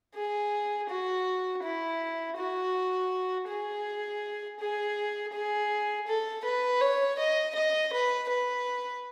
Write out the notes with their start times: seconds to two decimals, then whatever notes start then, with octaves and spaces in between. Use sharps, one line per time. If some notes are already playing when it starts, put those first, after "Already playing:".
0.15 G#4
0.89 F#4
1.63 E4
2.37 F#4
3.48 G#4
4.59 G#4
5.33 G#4
6.07 A4
6.45 B4
6.81 C#5
7.19 D#5
7.55 D#5
7.93 B4
8.29 B4